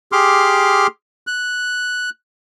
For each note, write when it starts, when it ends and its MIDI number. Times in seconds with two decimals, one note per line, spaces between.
0.12 0.87 67
0.12 0.87 68
0.12 0.87 84
0.12 0.87 86
0.12 0.87 89
1.27 2.10 90